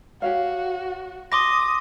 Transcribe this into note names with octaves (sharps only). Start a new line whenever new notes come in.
F#4 G4 C#5 F5
C6 D6 D#6 A#6